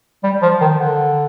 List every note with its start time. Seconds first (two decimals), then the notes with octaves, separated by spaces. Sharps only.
0.24 G3
0.42 F3
0.61 D#3
0.79 D3